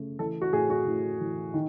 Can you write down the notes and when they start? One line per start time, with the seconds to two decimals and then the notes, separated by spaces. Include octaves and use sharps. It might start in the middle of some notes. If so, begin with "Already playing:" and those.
Already playing: C#3 A3
0.19 E3 A4
0.42 F#4
0.53 A2 G#4
0.70 F#4
0.86 A2
1.20 E3
1.54 D#3